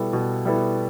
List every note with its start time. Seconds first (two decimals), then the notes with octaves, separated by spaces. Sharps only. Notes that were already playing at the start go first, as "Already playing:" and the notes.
Already playing: B2 G3 B3 E4 A4
0.13 B2
0.45 G3 B3 E4 A4